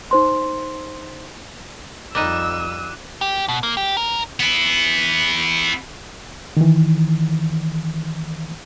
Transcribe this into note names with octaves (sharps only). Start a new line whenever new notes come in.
D#4 C5 C6
F2 G3 D#4 D6 E6 F#6 D#7
G4
B2
A#3
G4
A#4
B3 E4
D#3 E3